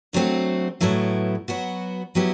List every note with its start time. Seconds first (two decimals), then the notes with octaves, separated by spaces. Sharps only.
0.13 D3 F#3 A3 C4 F#4
0.80 A2 F#3 B3 E4 A4
1.48 F#3 B3 F#4
2.15 F#3 B3 E4 G4